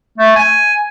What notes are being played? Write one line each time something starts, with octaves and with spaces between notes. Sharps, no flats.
A3
G#5